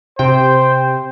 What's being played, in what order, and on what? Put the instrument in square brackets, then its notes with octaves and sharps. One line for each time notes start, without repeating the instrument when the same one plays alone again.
[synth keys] C3 G5 [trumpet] C5